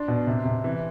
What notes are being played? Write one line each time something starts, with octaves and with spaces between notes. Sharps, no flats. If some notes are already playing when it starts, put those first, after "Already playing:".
Already playing: D4 C6
B2
C3
C3
E3